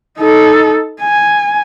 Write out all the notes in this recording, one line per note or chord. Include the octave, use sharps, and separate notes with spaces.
D#4 A4
G#5